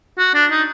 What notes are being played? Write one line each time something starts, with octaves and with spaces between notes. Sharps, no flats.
F#4
D4
D#4